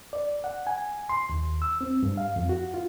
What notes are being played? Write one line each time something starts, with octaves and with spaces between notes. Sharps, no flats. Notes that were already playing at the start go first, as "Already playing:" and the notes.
D5
F#5
G#5
C6
D#2
E6
C4
G2
F5
F2
F#4
F4